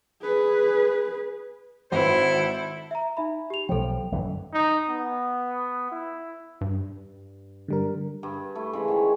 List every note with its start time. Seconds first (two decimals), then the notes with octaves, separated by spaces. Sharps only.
0.22 G#4 B4
1.92 G#1 E4 A4 B4 C5
2.91 E5 A#5
3.17 D#4 E5 B5
3.50 G4 F7
3.69 B1 F3 A4 G5
4.12 G1 F#2 E3
4.53 D#4
4.88 B3
5.92 E4
6.61 G2
7.68 D3 G3 A#4
8.23 G2
8.55 A3 E4
8.73 C#3 E3 G#3
8.88 D#3 C5 C#5